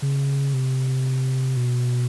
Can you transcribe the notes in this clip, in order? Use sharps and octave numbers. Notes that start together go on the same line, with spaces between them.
C#3
C3
B2